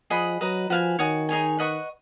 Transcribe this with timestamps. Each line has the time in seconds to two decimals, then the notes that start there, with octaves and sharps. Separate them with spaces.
0.10 F3 G#4 D#5 F#5 B5
0.41 F#3 B4 D#5 A#5
0.69 F3 F#4 B4 F5 G#5
0.99 D#3 F#4 C#5 G#5 D#6
1.29 D#4 G#4 C#5 G#5
1.59 B4 D#5 F#5 C#6